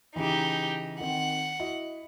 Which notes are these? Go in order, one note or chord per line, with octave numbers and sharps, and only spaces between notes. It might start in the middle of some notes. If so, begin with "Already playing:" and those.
C#3 E3 D#4 G4
D#3 C4 F#5
E4 F#4 D#5